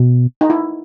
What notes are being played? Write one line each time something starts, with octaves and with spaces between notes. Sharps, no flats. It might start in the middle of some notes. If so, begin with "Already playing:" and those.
Already playing: B2
D#4
E4